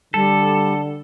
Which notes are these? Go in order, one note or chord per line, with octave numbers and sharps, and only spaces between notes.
D3 G3 A4